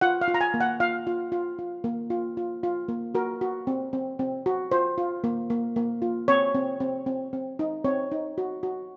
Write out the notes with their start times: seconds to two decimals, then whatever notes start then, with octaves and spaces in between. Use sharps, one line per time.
0.01 F4 F#5
0.21 F5
0.28 F4
0.34 A#5
0.41 G#5
0.54 A#3
0.61 F#5
0.80 F4 F5
1.07 F4
1.32 F4
1.59 F4
1.84 A#3
2.10 F4
2.37 F4
2.63 F4
2.89 A#3
3.15 F#4 A#4
3.41 F#4
3.67 C4
3.93 C4
4.19 C4
4.46 F#4
4.72 F4 C5
4.98 F4
5.24 A#3
5.50 A#3
5.76 A#3
6.02 F4
6.28 C4 C#5
6.54 C4
6.80 C4
7.06 C4
7.33 C4
7.59 D#4
7.85 C4 C#5
8.12 D#4
8.38 F#4
8.63 F#4